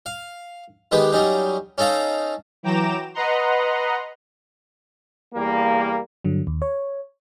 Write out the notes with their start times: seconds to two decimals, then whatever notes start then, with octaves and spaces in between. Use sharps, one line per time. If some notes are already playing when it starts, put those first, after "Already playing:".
0.06 F5
0.92 D#3 G#3 B3 G4 B4
1.12 F#3 G3 C#4 D#4
1.78 C#4 D#4 A4 F5 A#5
2.63 E3 F#3 G5 A#5 D6 E7
3.14 B4 D#5 F#5 A#5 C6
5.35 E2 G3 A#3
6.24 G2 D3 F#3
6.47 D#2
6.62 C#5